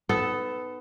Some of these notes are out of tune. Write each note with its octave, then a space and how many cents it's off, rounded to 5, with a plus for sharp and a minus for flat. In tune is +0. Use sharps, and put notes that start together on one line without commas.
B3 +20 D#4 +0 A4 +0